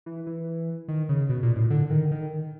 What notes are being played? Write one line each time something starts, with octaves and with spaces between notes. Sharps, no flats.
E3
E3
D#3
C#3
B2
A#2
A2
D3
D#3
D#3